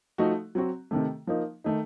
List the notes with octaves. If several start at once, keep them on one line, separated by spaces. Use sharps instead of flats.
F3 A3 D#4 F#4
F#3 C4 F#4
C3 D#3 A3
F3 A#3 D#4
D#3 A3 D#4